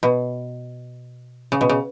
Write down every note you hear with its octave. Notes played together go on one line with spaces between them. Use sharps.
B2
C#3
B2
C#3